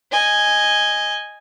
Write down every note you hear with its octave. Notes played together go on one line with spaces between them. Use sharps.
D#5 G#5